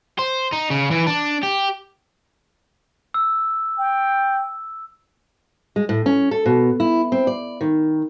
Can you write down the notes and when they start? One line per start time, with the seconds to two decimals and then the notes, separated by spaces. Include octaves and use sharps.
0.19 C5
0.52 D#4
0.70 C#3
0.91 E3
1.07 D4
1.43 G4
3.14 E6
3.78 G5
5.76 G#3
5.89 A2
6.06 C#4
6.31 A4
6.46 B2
6.80 E4
7.12 C4
7.27 D5
7.61 D#3